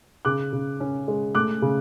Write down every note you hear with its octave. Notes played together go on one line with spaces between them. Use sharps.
C#3 D6 F#6
C#3
C#4
G#3
A3 D6 F#6
C#3